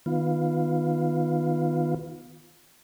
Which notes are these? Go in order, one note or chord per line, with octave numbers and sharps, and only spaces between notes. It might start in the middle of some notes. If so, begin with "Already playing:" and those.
D#3 B3 F4